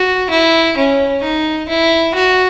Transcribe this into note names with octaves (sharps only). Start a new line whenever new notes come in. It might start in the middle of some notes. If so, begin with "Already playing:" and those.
Already playing: F#4
E4
C#4
D#4
E4
F#4